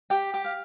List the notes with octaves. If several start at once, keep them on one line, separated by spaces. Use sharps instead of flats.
G4 G5
G4
F5